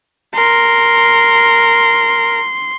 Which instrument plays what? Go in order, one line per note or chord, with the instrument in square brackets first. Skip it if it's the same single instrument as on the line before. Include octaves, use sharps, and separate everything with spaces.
[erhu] A#4 [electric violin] C6